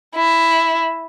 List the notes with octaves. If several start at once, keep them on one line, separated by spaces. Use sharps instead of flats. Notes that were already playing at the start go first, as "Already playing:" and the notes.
E4